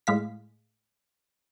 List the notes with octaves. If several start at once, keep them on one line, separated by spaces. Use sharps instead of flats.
A2 G#3 F5 B6